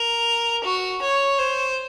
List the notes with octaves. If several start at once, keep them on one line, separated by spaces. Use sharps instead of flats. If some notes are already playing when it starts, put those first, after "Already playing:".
Already playing: A#4
F#4
C#5
C5